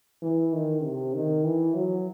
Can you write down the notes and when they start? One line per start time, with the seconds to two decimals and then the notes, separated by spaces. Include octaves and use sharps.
0.22 E3
0.53 D#3
0.84 C3
1.14 D#3
1.45 E3
1.74 F#3